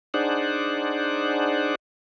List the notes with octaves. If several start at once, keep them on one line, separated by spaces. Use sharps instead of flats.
D4 D#4 G#4 C5 D5 F#5